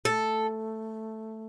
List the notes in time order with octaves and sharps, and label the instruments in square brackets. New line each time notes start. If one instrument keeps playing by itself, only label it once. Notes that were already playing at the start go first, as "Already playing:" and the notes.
[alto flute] A3 [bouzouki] A4